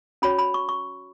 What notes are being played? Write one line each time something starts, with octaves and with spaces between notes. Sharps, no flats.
C#4 F#4 C#5 B5
B5
C#6
C#6